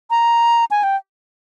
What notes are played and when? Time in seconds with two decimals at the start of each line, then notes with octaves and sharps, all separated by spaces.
0.10 A#5
0.71 G#5
0.83 G5